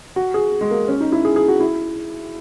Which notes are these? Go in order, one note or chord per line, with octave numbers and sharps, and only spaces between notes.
F#4
G#4
G#3
A#3
C#4
D#4
E4
G#4
G#4
F#4
E4